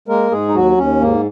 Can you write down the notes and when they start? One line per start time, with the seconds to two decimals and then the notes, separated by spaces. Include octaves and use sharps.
0.08 G#3 A#3 A#4
0.31 G#2 G#3 G#4
0.48 D#4
0.54 D#2 F#3 F#4
0.77 D#2 C#4
1.01 G#2 A#3